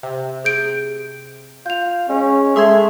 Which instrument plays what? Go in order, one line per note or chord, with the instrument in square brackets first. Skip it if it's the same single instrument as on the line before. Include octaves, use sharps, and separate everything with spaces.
[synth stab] C3
[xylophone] G#4 G6 D7
[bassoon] F4 [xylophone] G6 F7
[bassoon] G#3 [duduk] C#4
[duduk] G#3 [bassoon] A3 [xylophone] G#4 G#6 [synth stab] E5 C6